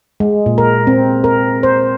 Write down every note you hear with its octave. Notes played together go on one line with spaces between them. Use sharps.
G#3
A#2
A#4
C4
A#4
C5